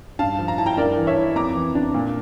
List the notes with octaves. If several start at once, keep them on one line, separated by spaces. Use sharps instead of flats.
G2 F5 A5
F3
A#5
E4 A5
G5 A#5
G2 A#4 D5
E3
C#5 E5
E4
F2 A#5 D6
E3
D4
A#2